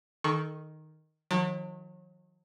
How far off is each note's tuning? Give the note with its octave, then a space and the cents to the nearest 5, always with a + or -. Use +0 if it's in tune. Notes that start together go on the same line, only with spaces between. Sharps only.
D#3 +0 A4 -25 C#6 +0
D#3 +25 F#3 -35